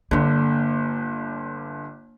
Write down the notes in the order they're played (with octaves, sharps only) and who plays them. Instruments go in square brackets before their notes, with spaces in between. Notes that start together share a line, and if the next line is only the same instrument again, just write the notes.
[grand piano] G1 D3 [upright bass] A#3 D4